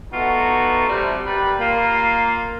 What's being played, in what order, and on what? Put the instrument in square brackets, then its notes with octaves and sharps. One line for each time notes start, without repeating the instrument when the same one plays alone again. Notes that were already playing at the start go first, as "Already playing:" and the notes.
[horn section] A3 B3 D#4 F4 F#4
C3 G3 A3
G3 G4 A#4 B4
A#3 F4